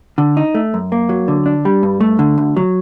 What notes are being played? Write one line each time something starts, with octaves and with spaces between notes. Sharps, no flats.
D3
D#4
A3
F#2
A#3
F#3
D3
D4
G3
G2
A3
D3
D2
F#3